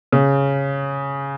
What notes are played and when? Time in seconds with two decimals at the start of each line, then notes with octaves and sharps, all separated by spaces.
0.12 C#3